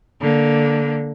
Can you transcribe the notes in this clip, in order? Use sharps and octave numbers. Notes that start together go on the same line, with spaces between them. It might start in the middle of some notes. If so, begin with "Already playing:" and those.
D3 A#3